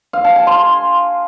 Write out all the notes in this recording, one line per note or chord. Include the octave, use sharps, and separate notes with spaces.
F5
A5
G#5
C6